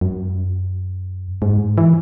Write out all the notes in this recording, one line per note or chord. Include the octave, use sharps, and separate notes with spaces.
F#2
G#2
E3